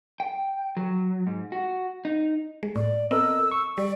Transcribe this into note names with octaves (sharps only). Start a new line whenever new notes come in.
G5
F#3
G#2
F#4
D#4
G#3
A2 D5
B3 C4 A4 A#4 D#5 E6
C#6
G3 D5